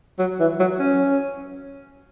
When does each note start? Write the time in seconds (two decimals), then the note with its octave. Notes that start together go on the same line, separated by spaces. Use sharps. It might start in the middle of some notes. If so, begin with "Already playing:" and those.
0.19 F#3
0.40 E3
0.60 F#3
0.80 C#4